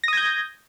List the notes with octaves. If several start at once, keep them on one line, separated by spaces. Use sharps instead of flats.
D#6 G6 G#6 A#6